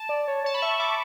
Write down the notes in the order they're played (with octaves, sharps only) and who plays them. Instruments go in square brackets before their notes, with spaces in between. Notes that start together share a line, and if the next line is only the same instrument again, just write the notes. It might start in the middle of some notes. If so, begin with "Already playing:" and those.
Already playing: [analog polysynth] A5
[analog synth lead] D5
C#5
[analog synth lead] C#5 [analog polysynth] A5
[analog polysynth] B5
[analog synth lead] E5 [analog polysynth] C#6
[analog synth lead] E5 [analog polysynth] D6